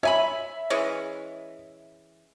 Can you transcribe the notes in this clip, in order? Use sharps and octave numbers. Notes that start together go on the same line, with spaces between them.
C#5 E5 G#5 B5
E3 G#3 C#4